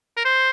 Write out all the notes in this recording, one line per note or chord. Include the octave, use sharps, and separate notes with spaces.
A#4
C5